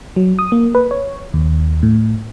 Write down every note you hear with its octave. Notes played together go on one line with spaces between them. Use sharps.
F#3
D#6
A#3
B4
C#5
D#2
A2